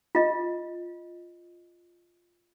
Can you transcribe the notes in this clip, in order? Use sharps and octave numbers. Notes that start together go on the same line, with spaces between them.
F4 D#5